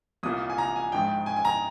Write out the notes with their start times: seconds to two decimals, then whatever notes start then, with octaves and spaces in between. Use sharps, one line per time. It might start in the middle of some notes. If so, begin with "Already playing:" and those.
0.23 C2 A#2 D#6
0.50 G#5
0.58 A#5
0.76 G#5
0.92 A#1 G#2 D#3 G5
1.26 G#5
1.36 G#5
1.45 A#5